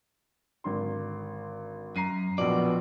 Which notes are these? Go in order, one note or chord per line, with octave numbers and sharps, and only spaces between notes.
G#1 D3 C6
F#2 A#5 C7 D#7
A#1 F2 B2 D5 F#7